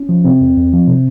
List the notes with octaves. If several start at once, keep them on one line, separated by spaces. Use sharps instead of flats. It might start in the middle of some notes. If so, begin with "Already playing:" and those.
Already playing: C#4
F3
C3 C4
E2
E2
F3
C3